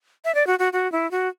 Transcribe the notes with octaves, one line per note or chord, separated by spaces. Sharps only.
E5
D5
F#4
F#4
F#4
E4
F#4